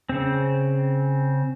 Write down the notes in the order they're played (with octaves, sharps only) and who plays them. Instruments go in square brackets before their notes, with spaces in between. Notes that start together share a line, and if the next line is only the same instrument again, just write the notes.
[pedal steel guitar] C#3 C4